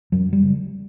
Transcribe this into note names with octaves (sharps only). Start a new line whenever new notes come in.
F#2 F#3
G3
C#3